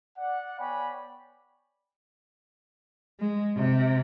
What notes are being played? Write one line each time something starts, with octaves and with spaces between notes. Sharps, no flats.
D5 F#5
B3 C#5 D5 G5 G#5 B5
G#3
C3